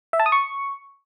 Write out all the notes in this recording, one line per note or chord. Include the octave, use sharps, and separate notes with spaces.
E5
A5
D#6
C#6